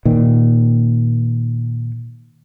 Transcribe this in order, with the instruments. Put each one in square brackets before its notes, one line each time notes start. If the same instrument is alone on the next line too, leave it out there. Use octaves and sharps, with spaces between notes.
[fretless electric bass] A#2 D#3